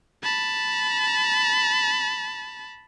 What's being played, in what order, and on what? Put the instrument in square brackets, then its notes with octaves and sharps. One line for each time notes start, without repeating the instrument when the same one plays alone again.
[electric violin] A5 B5